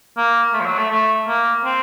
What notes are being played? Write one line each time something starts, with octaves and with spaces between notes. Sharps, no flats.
A#3
A3
F3
F#3
A3
A3
A#3
C4